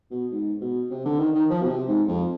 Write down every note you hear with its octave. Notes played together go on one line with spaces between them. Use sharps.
B2
G#2
B2
C3
D3
D#3
D#3
F3
B2
C3
G#2
F2